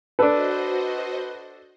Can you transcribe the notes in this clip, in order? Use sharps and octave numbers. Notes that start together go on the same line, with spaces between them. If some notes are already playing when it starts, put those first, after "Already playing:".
D4 F#4 A4 B4 C5 D#5